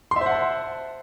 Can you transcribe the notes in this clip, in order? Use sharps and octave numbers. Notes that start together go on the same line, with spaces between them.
C5 E5 F#5 A5 C6